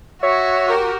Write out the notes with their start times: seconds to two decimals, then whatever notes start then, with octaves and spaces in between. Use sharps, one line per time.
0.23 F#4 C#5 E5
0.66 G4 A#4